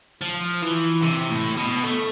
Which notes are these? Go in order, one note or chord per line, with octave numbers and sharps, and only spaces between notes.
F3
E3
C3
A2
B2
A3